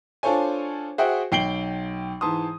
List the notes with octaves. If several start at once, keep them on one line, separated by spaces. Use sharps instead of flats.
D4 F4 A4 C5 C#5 G#5
F#4 G#4 C5 E5 G5
B1 G5 C7 D7 F#7 G7
G#2 E3 A5 C6 D#6